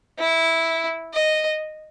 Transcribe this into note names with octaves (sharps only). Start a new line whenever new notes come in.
E4
D#5